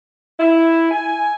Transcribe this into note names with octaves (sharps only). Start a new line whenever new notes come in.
E4
G#5